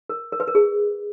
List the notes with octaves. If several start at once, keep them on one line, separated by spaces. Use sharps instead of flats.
A#4
A#4
B4
A#4
G#4